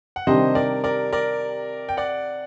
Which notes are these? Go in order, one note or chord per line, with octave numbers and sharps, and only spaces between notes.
F#5
C3 D#3 G3 D4 G4 C5 D#5
A#4 D5
A#4 D5
A#4 D5
G5
D5 F#5